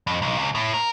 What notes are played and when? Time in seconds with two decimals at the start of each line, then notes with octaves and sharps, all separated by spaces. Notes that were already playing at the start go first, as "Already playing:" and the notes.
0.07 F2
0.22 B1
0.38 C#2
0.55 A2
0.74 A#4